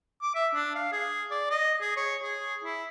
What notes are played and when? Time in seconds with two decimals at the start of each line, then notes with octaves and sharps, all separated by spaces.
0.22 D6
0.35 E5
0.54 D4
0.75 F5
0.92 G#4
1.31 D5
1.51 D#5
1.81 G#4
1.97 C#5
2.23 G#4
2.64 E4